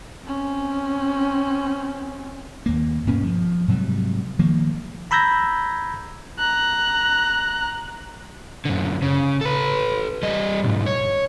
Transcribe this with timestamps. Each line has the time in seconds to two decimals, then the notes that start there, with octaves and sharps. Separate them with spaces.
0.23 C4 C#4
2.66 D#2 A#3
3.07 G2 B2 A#3 C#4
3.23 F3
3.68 G#2 C3 F#3 G3
4.39 D#3 F3 A#3
5.11 A#5 B5 E6 G6 G#6 A#6
6.39 A#5 F#6
8.65 F#2 D3
9.02 C#3
9.41 A4 B4
10.23 G3 D#5
10.63 B1 G#2
10.86 C#5